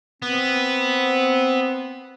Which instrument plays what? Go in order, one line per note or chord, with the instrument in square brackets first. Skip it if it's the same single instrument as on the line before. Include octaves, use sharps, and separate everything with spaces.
[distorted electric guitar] B3 [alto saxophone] C4